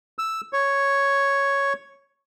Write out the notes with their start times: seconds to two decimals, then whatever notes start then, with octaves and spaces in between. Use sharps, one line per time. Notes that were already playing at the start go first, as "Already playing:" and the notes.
0.19 E6
0.53 C#5